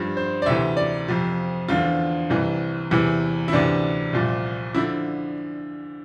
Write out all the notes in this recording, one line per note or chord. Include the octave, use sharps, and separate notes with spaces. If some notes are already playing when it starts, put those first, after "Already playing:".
Already playing: G2 F3
C5
D5
D2 C3 E3 E5
D5
F2 C3 F3
E2 D3 F3 F4
C2 C3 E3
E2 C3 E3 E4
E4
D2 C3 E3 D4
C2 A#2 F3
D3 F3 E4